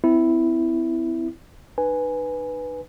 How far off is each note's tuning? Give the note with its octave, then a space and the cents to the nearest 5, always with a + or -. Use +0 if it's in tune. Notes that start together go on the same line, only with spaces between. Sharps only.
C4 -35 E4 +0
D#4 -40 B4 +0 G#5 +0